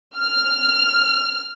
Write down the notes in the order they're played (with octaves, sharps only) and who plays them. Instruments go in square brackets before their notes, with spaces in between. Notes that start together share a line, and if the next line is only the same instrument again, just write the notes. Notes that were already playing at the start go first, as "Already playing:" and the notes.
[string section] F6